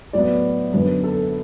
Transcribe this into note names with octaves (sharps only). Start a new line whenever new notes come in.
A2 F#3 B3 D5
F#2 D3 B3 B4
A4